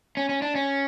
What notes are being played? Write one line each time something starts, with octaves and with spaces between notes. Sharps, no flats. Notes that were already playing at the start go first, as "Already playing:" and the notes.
C#4
C#4
D4
C#4